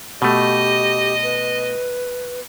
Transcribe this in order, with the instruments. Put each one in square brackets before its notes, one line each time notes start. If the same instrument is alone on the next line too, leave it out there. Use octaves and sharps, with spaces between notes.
[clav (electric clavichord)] B2 A3 [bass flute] G4 [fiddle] D#5
[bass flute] B4